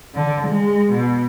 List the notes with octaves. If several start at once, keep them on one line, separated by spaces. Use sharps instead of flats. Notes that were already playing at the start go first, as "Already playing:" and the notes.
D3
G#3
B2